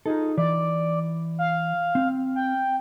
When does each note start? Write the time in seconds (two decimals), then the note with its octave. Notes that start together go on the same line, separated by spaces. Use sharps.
0.06 D#4 F4 G#4 A4
0.38 E3 D5
1.39 F5
1.95 C4
2.36 G5